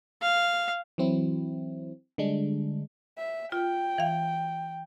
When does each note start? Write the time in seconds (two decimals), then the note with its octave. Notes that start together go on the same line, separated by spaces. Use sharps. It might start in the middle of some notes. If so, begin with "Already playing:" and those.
0.22 F5
0.98 E3 F#3 C4 E4
2.18 D3 G3 G#3 D4
3.18 E5
3.52 F4 G5
3.98 E3 F5